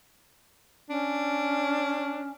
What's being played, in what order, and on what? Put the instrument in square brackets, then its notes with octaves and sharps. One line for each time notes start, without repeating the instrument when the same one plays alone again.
[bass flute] C#4 [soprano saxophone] D4